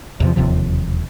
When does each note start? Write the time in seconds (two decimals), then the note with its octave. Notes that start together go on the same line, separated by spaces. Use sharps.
0.20 E2 C3 F3
0.36 E1 D#2 C3 F3